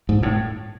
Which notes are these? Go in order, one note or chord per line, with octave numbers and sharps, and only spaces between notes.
G#2
A2